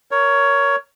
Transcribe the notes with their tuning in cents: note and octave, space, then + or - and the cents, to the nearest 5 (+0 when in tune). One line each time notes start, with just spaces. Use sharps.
A#4 +0 C#5 +15